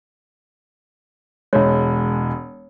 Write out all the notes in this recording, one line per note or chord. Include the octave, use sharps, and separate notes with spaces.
E1 G#3 C#5